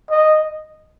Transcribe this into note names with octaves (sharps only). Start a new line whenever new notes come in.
D#5